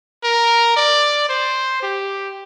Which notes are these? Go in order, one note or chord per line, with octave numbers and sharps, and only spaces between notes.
A#4
D5
C5
G4